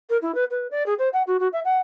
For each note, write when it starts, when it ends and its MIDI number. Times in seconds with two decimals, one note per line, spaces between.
0.09 0.17 70
0.22 0.34 64
0.34 0.44 71
0.50 0.67 71
0.71 0.83 74
0.86 0.94 68
0.98 1.09 72
1.13 1.23 78
1.27 1.37 66
1.40 1.48 66
1.53 1.60 76
1.64 1.78 78